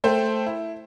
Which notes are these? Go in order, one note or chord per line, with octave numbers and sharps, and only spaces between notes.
A3 A4 C5 G5
E4